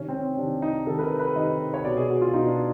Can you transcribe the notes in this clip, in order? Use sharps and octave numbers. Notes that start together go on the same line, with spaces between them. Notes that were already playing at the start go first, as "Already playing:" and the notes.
Already playing: C3 D#3 C#4
C4
C#4
C3 D#3 D4
D#4
C3 D#3 A4
B4
A#4
B4
C3 D#3 D#5
C#5
B2 D5
G#4
F#4
F4
B2 D#4
D4